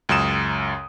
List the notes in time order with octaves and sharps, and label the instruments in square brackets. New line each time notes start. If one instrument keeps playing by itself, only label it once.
[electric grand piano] C#2 F#2 D#6 E7